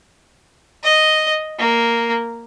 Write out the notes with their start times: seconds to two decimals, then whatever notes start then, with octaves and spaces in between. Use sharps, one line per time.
0.84 D#5
1.59 A#3